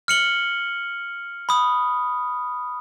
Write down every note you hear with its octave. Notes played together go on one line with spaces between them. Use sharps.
F6 C#7 F#7 G7
B5 D#6